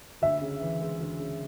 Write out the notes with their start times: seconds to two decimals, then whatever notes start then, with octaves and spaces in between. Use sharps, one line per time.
0.22 D2 E5
0.41 C#3
0.61 E3
0.81 G#3
1.00 D2
1.20 C#3